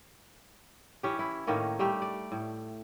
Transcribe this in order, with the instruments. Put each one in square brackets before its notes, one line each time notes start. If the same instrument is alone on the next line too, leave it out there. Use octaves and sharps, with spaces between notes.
[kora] E3 C#4 G4
E4
A2 D#3 A#3 C#4
G3 A3 G4
D5
A2